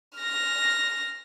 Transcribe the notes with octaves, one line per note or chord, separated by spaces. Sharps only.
F6 A#6